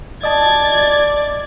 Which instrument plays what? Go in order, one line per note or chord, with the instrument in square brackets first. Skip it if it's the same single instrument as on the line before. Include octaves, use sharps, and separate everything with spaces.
[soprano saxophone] D5 [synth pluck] D#5 A5 [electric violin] G#6 A6